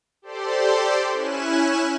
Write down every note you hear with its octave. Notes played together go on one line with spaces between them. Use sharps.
G4 A4 C5 D5 C6
C#4 E4 G#5 F#6 E7